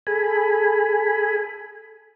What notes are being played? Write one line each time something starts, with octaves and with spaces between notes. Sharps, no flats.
G#4 A4 G#5 B5